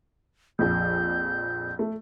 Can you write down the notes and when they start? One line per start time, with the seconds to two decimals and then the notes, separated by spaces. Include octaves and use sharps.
0.59 A#1 F2 G6
1.79 A3